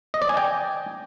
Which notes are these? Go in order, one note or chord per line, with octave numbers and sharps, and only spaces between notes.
D#5
D5
G#5
G5